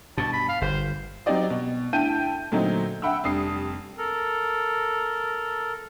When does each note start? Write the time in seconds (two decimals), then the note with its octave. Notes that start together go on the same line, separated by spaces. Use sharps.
0.18 G2 B2 A5
0.33 B5
0.49 F5
0.61 G1 C5
1.26 F#3 C4 D#4 G4 D5 D#5
1.50 B2
1.93 D2 E4 G5 A5 G6 D#7
2.52 A#2 D3 F#3 A3 C4 D#4
3.02 E5 F#5 G5 B5 E6
3.24 F1 G3 D4 D#6 C7
3.98 A4 A#4